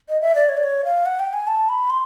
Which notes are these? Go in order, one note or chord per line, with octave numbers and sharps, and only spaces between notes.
D#5
E5
D5
C#5
D5
C#5
F5
F#5
G5
G#5
A5
B5
C6